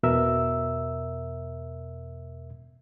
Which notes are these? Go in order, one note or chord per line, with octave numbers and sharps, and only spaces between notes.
E2 B2 A#4 E5 E6